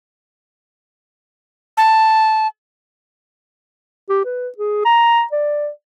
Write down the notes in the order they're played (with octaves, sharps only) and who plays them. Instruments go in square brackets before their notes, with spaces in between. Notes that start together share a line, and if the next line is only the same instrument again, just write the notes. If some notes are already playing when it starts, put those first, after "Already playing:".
[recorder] A5
[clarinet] G4
B4
G#4
A#5
D5